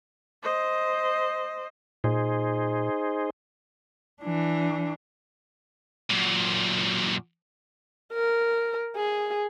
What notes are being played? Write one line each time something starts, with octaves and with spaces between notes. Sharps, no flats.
C5 D#5
A#2 D#4 G#4 C5
E3 D4
F#2 A#2
A#4
G#4